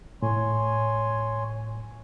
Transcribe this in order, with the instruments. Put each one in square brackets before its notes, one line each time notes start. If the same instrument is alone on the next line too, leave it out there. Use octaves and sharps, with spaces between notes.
[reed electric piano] A2 [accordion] C#5 G#5 C6